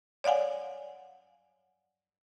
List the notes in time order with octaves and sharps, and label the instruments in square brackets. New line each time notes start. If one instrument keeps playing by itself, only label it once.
[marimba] C#5 D5 F5 F#5 G#5